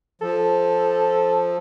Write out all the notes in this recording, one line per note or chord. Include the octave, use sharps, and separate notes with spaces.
F3 A4